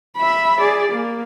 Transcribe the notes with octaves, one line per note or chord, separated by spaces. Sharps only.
E5 B5
G#4 D5
A#3